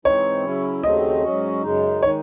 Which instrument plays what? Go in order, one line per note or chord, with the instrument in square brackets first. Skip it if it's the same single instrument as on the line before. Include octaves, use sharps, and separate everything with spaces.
[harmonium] G#2 E3 C4 D#4 [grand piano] C#5
[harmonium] C#3 F#3 C#4 E4
[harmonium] D#2 C#3 F#3 A3 C4 [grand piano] D#5
[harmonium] G#2 F#3 C#4 F#4
F#2 C#3 G#3 D#4
[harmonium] D#3 G#3 D#4 [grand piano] C#5